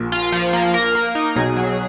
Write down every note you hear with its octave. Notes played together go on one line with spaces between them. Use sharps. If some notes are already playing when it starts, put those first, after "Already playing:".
Already playing: A#1 A#2
F4
F3
A#3
A#4
A#3
D#4
B1 B2 G#4
F#3